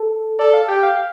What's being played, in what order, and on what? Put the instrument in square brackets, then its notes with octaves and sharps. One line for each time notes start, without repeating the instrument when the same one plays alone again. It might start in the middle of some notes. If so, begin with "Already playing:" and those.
Already playing: [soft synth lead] A4
[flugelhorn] A4 [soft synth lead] D5
[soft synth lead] F5
[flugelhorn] G4 [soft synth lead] G5
[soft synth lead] F5
F5